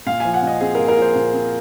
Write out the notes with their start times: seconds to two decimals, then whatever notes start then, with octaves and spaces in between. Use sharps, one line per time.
0.07 A#2 F5
0.20 F3 G#5
0.34 F#5
0.43 A#2 D#5
0.61 C4 G#4
0.75 A#4
0.79 A#2
0.88 A#4
0.97 F3 C5
1.15 A#2
1.34 C4